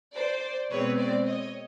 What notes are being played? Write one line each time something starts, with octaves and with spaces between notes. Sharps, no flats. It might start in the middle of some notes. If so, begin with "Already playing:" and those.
C5 D5
B2 G#3 C4 B4 C#5
C5 D5
C#5 D#5